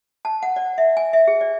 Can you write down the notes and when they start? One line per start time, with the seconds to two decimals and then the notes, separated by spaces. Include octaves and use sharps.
0.25 A5
0.43 F#5
0.56 D5
0.78 E5
0.97 G#5
1.13 E5
1.27 G#4
1.41 D5